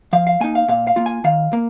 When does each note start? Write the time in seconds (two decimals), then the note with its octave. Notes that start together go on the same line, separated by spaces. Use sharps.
0.13 F3 F5
0.27 F5
0.40 A#3 D#4 G#5
0.55 F5
0.68 A#2 F5
0.87 F5
0.96 A#3 F4
1.06 G#5
1.24 D#3 F5
1.53 A#3